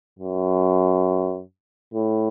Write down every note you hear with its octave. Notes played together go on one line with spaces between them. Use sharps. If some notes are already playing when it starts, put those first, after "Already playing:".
F#2
A2